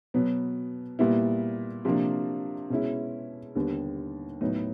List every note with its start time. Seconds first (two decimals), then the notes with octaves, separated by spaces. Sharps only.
0.14 B2 F#3 B3
0.99 A#2 G3 B3 E4
1.85 C3 F3 A#3 D4
2.70 B2 G#3 C#4 E4
3.55 D#2 D3 G3 B3
4.41 A2 F#3 B3 D#4